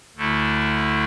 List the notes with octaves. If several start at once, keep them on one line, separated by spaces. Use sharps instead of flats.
D2 D3 A3 E4